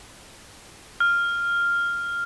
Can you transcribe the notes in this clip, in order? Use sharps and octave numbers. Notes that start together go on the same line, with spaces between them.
F6